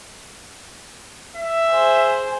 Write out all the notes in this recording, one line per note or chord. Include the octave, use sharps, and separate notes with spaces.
E5
G#4 C5